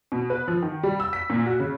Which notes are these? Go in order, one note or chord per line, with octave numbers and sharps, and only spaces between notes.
B2
B4
F3
D#3
G3
E6
B6
A#2
F#4
C#3